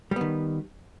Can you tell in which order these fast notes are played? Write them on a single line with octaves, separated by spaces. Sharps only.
G3 B3 D#3